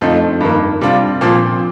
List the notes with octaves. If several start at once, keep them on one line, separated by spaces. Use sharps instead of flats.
F2 D3 F3 A3 D#4
G2 D#3 A#3
C3 G3 D4 F4
A#2 F3 C4